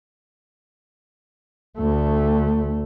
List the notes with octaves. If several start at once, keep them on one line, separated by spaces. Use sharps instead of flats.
D2 A3